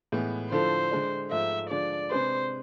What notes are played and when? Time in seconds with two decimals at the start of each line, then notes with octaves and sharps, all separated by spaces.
0.12 A2 E3 G#3 B3
0.52 D3 F3 A3 E4 A4 C5
0.91 D3 G#3 D4
1.31 G#2 F3 A3 E5
1.70 D3 F3 G#3 D4 D5
2.11 C3 G#3 D4 G#4 B4 C5